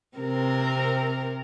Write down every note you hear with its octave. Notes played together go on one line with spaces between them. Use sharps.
C3 C4 A#4